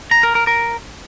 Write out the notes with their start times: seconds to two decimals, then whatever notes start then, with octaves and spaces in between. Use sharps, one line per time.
0.11 A#5
0.23 A#4
0.35 A#4
0.47 A#4